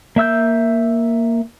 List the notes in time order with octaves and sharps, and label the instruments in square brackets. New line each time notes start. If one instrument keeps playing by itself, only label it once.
[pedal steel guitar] A#3 E5 E6 G6